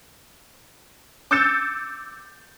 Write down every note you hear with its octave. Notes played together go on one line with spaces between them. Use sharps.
D6 E6 G6 A6 C#7 E7